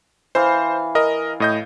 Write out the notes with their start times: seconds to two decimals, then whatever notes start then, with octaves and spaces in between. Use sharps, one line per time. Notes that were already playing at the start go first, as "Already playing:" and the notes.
0.35 E3 C5 F5
0.95 A#4 D#5
1.40 A2 D#5 G6